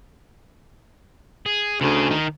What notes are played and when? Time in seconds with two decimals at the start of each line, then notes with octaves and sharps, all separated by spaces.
1.46 G#4
1.81 D2 C#3 G#4
2.11 D#3 D#4